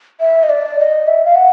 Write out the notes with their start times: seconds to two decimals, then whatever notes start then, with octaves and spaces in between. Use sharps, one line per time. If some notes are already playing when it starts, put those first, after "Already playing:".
0.20 E5
0.43 D#5
0.49 D5
0.79 D#5
1.07 E5
1.25 F5
1.35 F#5